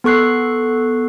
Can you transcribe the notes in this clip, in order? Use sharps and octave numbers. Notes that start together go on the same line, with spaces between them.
B3 A4 C#6 F#6 C7